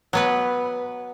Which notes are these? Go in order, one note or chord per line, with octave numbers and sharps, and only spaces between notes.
F#3 B3 B4